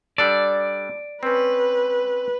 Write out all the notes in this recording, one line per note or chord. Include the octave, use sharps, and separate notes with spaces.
G3 D4 A4 D5
C4 C#4 B4